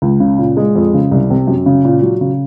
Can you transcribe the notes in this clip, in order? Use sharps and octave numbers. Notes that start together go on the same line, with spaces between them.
C#2
C#3
A#2
G#3
F2
C#3
C2
C3
F#2
C#3
A#2
F#3
C#3